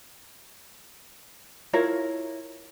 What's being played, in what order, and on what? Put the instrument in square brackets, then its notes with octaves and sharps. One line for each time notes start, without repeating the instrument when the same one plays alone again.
[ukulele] E4 F4 A#4 C#5